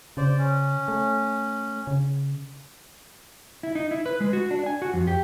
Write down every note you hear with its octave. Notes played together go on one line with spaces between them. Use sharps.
C#3 C5 D5
C#4
A3
C#3
E4
D#4
E4
B4
G#3
F#4
D4
G#5
F#4
F2
G4